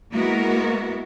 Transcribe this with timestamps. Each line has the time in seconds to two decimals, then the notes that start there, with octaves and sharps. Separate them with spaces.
0.12 G#3 A#3 B3 E4 F#4 A#4